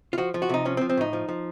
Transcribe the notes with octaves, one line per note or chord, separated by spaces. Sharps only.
F4
F3 F#4
F3
F#4
C3 D#4
F3 C#4
C4
F3
C4
A2 D#4
F3
F3